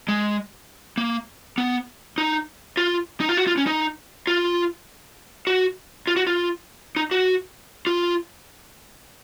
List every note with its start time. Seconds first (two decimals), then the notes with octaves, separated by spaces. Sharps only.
0.08 G#3
0.97 A#3
1.58 B3
2.18 D#4
2.77 F4
3.20 D#4
3.29 F4
3.37 F#4
3.47 F4
3.57 C#4
3.67 D#4
4.27 F4
5.47 F#4
6.07 F4
6.16 F#4
6.27 F4
6.96 D#4
7.11 F#4
7.87 F4